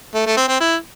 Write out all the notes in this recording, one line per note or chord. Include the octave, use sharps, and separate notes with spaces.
A3
A3
C4
C4
E4